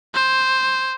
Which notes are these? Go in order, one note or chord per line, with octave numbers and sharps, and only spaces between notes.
C5